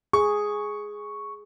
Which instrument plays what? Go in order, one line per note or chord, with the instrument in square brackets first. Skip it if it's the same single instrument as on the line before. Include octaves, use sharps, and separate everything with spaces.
[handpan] G#4 [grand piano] C#6